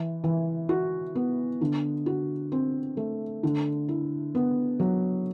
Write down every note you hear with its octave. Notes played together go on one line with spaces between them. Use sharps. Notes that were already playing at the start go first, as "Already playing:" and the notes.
Already playing: E3
E3
F#4
B3
D3
F#4
C4
A3
D3
E4
B3
F#3